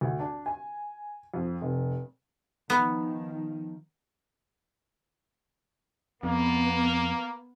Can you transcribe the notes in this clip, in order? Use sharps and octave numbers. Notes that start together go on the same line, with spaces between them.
D2
D4
G#5
F2
F1
D#3 F3 B3
F2 A#3 B3